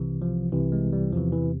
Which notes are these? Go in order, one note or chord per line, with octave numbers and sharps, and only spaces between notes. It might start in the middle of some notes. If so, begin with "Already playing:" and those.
Already playing: C2 C3 E3
F3
C2 C3 E3
G#3
G3
E2 C3 E3 F3
E3